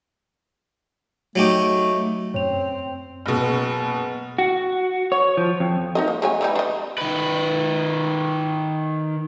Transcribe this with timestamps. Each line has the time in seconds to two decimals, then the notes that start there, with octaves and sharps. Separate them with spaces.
1.36 F#3 A3 D#4 G4
2.34 F#2 C4 C#5 F7
3.26 F#1 B2
4.38 F#4
5.12 C#5
5.37 F3
5.60 F2
5.95 D#4 A#4 D#5
6.08 A#3
6.22 G#3 C#5 G#5
6.41 E3 G3 D#4
6.55 D4 D#5
6.98 D#3 B4